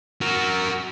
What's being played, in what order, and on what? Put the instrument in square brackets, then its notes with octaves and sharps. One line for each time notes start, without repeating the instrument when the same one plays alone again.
[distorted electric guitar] F#4 A#4